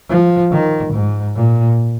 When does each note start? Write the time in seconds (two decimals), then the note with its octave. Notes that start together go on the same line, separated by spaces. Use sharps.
0.10 F3
0.52 D#3
0.93 G#2
1.35 A#2